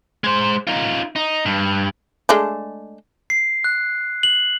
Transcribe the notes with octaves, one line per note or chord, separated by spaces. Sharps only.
G#3 C5
D#4 F4
D#4
G2
G#3 A3 D4
C7
F#6
F#7